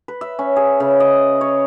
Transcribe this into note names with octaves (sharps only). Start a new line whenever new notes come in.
B4
E5
C#4
G#4
C#3
D#5
C#5